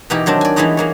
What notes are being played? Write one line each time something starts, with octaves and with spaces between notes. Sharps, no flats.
B2 E3 D#4 F#4 G4
D#3 F#3 C4 D4
D5 G#5
E3 G3 G#3 B3 D#4 F#4
E3 A#3 C#5